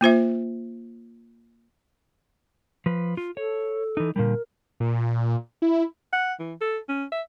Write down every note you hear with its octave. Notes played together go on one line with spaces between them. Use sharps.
A#3 F4 C5 E5
F3 B4
F4
A4 C#5
E3 D#4
A#2 D3 G3 A#4
A#2
E4
F#5
E3
A4
C#4
E5